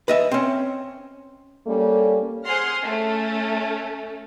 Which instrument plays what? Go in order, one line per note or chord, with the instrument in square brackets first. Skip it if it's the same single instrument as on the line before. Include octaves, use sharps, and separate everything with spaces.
[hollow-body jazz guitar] B4 D#5 E5
C4 C#4
[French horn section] G3 A#3 C#4 A4
[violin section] G#4 C5 F#5 C6 F6
A3 C#4 A4